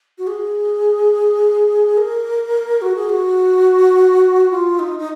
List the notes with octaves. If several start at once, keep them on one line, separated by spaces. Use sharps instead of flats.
F#4
G#4
A#4
F#4
G#4
F#4
F4
D#4
D#4